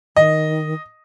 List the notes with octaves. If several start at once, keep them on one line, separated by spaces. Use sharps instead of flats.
D#3 D#5